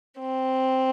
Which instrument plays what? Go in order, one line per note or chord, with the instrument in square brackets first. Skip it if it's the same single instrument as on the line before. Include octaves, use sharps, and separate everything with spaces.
[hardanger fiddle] C4